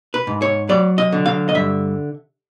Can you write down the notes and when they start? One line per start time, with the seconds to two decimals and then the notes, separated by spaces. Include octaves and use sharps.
0.14 B4
0.27 G#2
0.42 C#5
0.69 F#3 D5
0.98 D#5
1.13 D3
1.26 F5
1.49 D#5
1.55 G2 E5